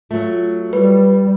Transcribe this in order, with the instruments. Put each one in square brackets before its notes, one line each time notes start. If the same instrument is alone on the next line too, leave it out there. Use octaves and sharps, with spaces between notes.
[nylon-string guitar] F#3 A3 [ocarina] F4
[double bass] G3 [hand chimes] B4